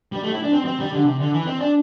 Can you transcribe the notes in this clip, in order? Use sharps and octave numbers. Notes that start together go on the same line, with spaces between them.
G3
A3
E4
D4
C4
C4
G3
D3
C3
D3
E3
C4
D4